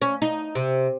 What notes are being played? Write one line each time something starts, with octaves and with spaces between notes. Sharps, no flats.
C#4
D#4
C3